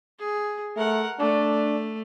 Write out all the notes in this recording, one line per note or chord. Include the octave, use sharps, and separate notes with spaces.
G#4
A3 A#4 F#5
A3 D4